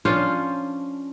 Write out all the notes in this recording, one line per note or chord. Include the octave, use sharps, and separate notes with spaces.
F3 C#4 D4 F4